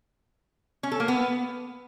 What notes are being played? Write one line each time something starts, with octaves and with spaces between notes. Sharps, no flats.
C#4
A4
A#3
B3